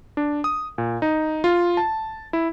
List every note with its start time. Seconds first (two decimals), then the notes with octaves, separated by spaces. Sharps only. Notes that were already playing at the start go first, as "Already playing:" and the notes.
0.17 D4
0.44 D#6
0.78 A#2
1.02 D#4
1.44 F4
1.77 A5
2.33 E4